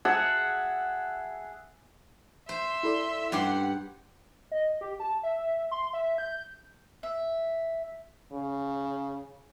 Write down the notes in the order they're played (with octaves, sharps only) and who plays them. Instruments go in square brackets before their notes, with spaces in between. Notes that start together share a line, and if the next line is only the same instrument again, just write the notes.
[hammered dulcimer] G#4 E5 F#5 A5
[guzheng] C5 [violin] E5 C6
[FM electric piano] E4 A4 D5
[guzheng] G2 G4 C6 [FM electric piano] C#4 [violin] F#5
[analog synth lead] D#5
G4
A5
E5
C6
E5
G6
[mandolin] E5
[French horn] C#3